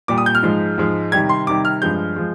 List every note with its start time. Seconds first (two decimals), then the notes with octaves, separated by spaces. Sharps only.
0.08 A#2 G3 D6
0.18 D#6
0.26 G6
0.35 F6
0.43 G#2 F3 G#3
0.78 G#2 F3 G#3
1.12 C3 D#3 G3 G#6
1.29 C6
1.47 C3 D#3 G3 D6
1.65 F6
1.82 G2 F3 G#3 G6
2.16 F3 G#3